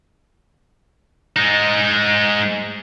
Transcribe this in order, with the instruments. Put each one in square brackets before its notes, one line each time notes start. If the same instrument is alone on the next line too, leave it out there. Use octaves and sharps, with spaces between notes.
[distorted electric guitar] G#3 D#4